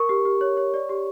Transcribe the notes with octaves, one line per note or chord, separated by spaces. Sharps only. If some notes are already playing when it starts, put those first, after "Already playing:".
Already playing: A#4 C#6
G4
G4
C#5
C#5
D5
G4